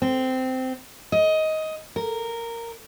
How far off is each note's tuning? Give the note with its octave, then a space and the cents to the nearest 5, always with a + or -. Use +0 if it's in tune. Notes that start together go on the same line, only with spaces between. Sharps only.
C4 -15
D#5 +15
A#4 -10